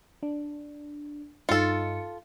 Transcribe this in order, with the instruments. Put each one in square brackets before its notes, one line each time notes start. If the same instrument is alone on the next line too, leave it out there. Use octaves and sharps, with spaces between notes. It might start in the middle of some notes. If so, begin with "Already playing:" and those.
[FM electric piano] D4
[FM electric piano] G2 D#4 C#7 [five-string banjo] F4 A4